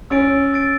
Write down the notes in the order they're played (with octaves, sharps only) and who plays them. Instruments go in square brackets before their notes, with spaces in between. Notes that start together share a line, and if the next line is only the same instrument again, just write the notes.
[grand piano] C#4 [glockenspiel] E6 A6 D7
[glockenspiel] E6 A6 D7